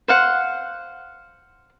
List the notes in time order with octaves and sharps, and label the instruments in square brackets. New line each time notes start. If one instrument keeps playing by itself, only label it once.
[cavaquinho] C5 F5 F#5